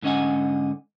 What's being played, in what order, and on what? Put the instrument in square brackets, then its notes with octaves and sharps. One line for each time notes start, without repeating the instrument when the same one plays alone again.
[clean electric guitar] G#2 D3 C#4 D#5 F#5 G#5